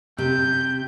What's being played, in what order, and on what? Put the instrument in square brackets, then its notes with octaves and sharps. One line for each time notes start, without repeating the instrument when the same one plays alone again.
[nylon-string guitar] C3 [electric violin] G6